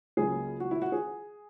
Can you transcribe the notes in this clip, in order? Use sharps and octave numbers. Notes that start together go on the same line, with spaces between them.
C#2 C#3 F#3 A#3 G#4
F#4
E4
F#4
G#4